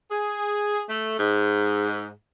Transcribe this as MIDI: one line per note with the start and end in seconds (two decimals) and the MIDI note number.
0.11 0.82 68
0.89 1.16 57
1.19 2.12 44